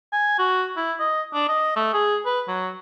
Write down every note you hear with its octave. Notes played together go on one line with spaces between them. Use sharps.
G#5
F#4
E4
D#5
D4
D#5
A3
G#4
B4
F#3